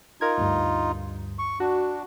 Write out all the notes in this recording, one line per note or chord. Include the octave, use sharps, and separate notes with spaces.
D#4 F4 A#4 G#6
D2 G2
C#6
D4 F#4